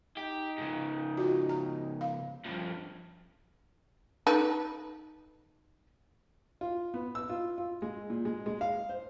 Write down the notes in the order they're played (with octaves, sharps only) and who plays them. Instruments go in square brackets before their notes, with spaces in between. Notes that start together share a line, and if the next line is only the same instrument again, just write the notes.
[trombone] D#4 [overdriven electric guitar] G4
[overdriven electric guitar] G#2 C#3
[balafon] F4 F#4
A#5
F5
[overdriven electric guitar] G2 F3
[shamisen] D#4 A4 B4
[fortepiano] F4
B3
E6
F4
F4
G#3
A#2
G#3
G#3
F5
C5